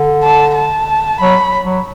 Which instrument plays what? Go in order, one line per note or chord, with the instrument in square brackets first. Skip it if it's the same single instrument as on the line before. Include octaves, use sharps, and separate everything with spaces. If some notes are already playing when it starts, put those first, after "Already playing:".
Already playing: [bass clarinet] D3
[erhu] A5
A5
[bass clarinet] F#3 [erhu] B5
[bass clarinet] F#3